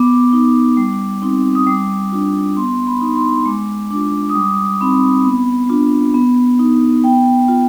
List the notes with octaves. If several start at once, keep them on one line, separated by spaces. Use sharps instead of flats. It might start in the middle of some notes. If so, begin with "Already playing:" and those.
Already playing: B3 D6
D#4
G3
C4 D#4
D#6
G3 D6
D4 F4
B3 C6
B5
D#4
C6
G#3 D6
D4 D6
F4
D#6
G3 D6
C4 D#4 B5
B3
D4 F4
B3
D#4
B3 G5
F4